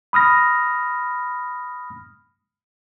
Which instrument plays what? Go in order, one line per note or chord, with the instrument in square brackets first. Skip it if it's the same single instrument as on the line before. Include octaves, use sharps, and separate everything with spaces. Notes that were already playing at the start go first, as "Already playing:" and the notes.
[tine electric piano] B5 D#6 F6 A#6